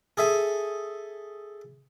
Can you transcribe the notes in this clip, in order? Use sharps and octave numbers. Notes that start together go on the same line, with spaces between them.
G#4 A4 E5 G#5